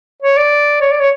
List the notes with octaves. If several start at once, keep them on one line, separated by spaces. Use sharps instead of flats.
C#5
D5
C#5
D5
C#5